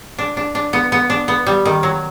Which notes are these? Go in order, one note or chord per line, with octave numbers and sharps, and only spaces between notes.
D4
D4
D4
B3
B3
D4
B3
G3
D#3
F#3